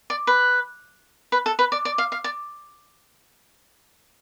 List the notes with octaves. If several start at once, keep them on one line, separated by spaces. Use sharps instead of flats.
D5
B4
B4
A4
B4
D5
D5
F5
F5
D5